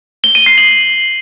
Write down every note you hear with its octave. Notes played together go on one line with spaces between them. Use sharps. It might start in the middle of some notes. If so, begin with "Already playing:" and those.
G7
D#7
C7
F#7